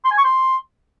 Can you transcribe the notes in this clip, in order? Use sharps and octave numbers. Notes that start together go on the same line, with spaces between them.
C6
G#5
C#6
C6